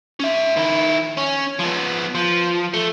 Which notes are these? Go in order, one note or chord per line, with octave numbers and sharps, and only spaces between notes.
C#4 E5
D#3 E4
C#4
F3 B3
F3
A3